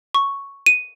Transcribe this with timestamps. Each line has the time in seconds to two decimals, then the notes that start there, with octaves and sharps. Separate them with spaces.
0.14 C#6
0.66 D#7